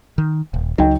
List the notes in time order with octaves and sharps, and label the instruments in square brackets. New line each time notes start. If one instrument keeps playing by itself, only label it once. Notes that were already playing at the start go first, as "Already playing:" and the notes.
[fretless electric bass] D#3
D#1
[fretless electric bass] C#2 F#3 [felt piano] D#4 G5